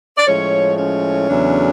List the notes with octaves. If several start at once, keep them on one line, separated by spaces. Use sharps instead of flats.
D5
A2 F3 G#3 C#4 C#5
C#4 C#5
E2 C#3 F#3 A3 D4